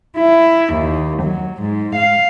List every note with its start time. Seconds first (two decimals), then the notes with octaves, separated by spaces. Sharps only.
0.18 E4
0.74 D#2
1.22 F#3
1.62 G#2
1.95 F5